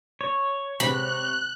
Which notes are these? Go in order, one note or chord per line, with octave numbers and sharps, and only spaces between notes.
C#5
C3 B5 F#6